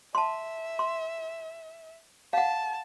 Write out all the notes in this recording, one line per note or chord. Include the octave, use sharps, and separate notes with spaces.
E5 A5 C6
C6
F5 F#5 A5